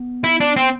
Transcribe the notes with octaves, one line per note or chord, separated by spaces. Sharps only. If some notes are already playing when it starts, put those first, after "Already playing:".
Already playing: B3
E4
D4
C4